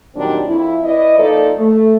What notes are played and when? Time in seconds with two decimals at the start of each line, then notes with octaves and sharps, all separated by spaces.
0.15 A#2 D#3 F#3 G3 C4 D4
0.47 F2 E4
0.84 E4 B4 D5 D#5
1.18 F3 A#3 D#4 A4 A#4 D5
1.57 A3